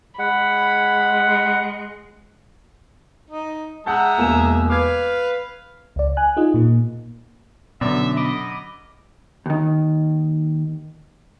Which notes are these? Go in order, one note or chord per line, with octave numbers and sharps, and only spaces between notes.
G#3 F#5 B5
D#4
G#3 E5 F#5 A5 A#5 G6
E1 A#3 E7
B4 F5 D6 G#6
C#2 D5
G#5 F#6
D#4 F4 G#4 D#5
A#2 A#3
F#2 B2 D3 D5 E5
D#5 B5 D6
D#2 D#3